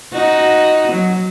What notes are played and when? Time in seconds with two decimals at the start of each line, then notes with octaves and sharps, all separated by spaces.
0.13 D#4 F#4
0.92 F#3